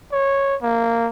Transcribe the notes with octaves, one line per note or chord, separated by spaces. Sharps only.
C#5
A#3